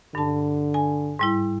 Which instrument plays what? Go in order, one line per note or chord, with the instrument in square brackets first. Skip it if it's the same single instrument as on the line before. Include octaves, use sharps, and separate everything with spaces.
[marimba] G2 A5 [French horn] D3
[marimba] G#5
G#2 G3 E4